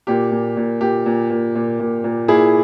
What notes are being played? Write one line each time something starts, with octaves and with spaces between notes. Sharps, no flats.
A#2 G4
A#2
A#2
A#2 G4
A#2
A#2
A#2
A#2
A#2
A#2 E4 G#4